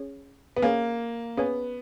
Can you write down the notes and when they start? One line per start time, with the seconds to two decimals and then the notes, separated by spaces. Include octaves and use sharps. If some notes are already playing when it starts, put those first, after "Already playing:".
Already playing: C#4 G#4 C#5
0.57 B3
0.62 A#3 C#4 G#4 C#5 F5 G#5
1.37 B3 C#4 G#4 C#5 F5 G#5